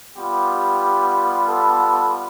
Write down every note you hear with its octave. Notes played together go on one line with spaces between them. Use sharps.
G3 B3 F4 G4
A4